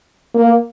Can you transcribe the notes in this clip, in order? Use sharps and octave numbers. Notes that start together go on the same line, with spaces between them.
A#3